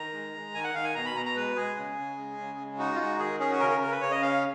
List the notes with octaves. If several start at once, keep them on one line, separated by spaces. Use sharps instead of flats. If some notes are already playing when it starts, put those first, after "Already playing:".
Already playing: D#3 A#5
G#3
G#3
D#3 G#5
F#5
D#3 F5
G#5
B2 A#5
B5
B2 A#5
A#5
G#3 B4
G#3 G#4
C#3
C#3
G#3
C#3
G#3
D#4 F#4
F4
G#3 F#4
D#3 G#4
C#4 G#4
F#4
C#3 A#4
A#4
C#3 A#4
B4
C#3 C#5
D#5
C#4 F5